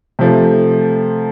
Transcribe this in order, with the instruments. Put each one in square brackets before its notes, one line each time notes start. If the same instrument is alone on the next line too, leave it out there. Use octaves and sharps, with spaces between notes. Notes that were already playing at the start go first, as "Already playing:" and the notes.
[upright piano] C3 F3 A3